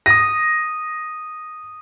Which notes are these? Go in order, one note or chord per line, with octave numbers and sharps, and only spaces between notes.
D#6 A#6 D#7